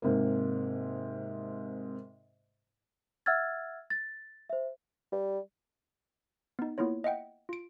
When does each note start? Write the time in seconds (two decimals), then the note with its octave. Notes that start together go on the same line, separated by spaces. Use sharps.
0.02 G#2 C3 A#3
3.26 E5 F#5 E6 F6 G#6 A6
3.90 A6
4.50 C5 E5
5.12 G3
6.59 B3 D#4
6.78 A#3 B3 E4 F4 C#5
7.04 D#5 E5 F#5 G5
7.49 F4 D7